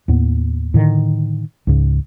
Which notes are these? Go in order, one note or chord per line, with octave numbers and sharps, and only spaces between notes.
D#2 A2 B3
A2 D3 D#3
C#2 G#2 C#3